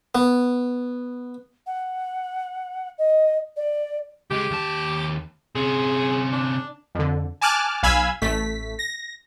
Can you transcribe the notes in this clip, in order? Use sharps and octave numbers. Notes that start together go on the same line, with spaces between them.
B3
F#5
D#5
D5
C#2 G#3 G4
D#2 A5
C3 C#4 G#4
D4
F2 D3
G#5 A5 D6 F6 F#6
B1 F5 G#5 B5 E6 G#6
A1 A3 B6
A#6